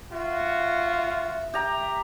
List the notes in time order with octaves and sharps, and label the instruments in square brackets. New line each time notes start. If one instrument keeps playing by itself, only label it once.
[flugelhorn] F4 [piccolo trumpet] F#4 [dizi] E5
[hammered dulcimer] G4 A#5